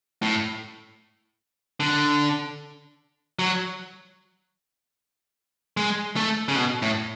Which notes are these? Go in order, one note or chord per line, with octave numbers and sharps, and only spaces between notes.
A2
D3
F#3
G#3
A3
C#3
B2
A2